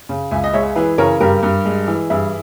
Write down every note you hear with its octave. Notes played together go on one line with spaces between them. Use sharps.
C#3
C#2 E5 G#5
D#5
G#3 C#5 E5
E3 G#4 B4
C#3 A#4 C#5
G2 G4 A#4
G2
G#3
E3
G2 E4 G#4